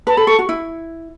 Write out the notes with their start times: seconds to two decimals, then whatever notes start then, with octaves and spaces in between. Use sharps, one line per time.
0.07 B4 A5
0.17 A4 B5
0.27 A4 C#6
0.39 F#4
0.49 E4